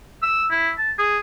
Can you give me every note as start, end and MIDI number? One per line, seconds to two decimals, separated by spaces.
0.23 0.45 88
0.51 0.70 64
0.78 0.91 81
0.99 1.19 68